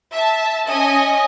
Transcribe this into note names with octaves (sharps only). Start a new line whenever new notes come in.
E5 A5
C#4 D#5 G#5